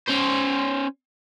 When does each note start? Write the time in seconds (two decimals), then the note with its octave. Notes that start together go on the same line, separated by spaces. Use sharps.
0.08 C#4 C5